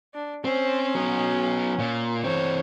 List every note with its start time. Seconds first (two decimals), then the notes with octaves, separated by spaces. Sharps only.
0.14 D4
0.45 C4 C#4
0.95 F#3 B3
1.80 A#2
2.24 E3 C4 C#5